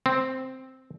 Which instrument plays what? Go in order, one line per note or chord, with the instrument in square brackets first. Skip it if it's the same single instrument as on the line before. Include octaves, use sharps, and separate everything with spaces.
[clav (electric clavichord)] C4